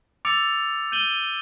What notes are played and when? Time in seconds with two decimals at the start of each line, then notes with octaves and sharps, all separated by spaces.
0.25 D6 E6 A6 C#7 D7 F7
0.92 G6 D#7 F#7 G7